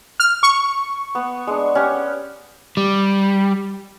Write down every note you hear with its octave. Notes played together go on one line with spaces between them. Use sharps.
F6
C#6
B3
G#3 D4
C#4 G4 F#5
G3